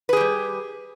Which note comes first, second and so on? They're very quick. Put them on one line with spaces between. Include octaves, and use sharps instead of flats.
B4 G#4 G4 G3